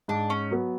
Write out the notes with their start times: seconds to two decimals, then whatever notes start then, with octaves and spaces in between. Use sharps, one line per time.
0.08 G#2 D4
0.30 C#4
0.51 F#3 B3